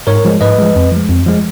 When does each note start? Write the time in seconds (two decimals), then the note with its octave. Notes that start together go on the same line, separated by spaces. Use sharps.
0.07 G#2 A#4 C#5
0.25 F3 G#3
0.41 G#2 B4 D#5
0.58 F3 G#3
0.76 F2
0.92 F3 G#3
1.10 F2
1.26 F3 G#3